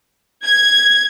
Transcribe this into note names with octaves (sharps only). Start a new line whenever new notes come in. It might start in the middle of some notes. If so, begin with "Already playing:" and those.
G#6